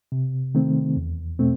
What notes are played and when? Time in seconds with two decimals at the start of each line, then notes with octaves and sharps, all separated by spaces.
0.12 C3
0.55 D#3 A3 C4
0.97 E2
1.39 B2 A3 C4